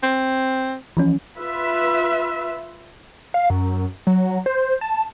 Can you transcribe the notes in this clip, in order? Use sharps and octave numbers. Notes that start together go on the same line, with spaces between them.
C4
E3 F3 C#4
F4 B4 E5
F5
F#2
F#3
C5
A5